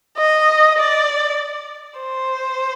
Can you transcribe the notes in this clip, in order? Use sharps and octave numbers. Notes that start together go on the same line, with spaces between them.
D#5
D5
C5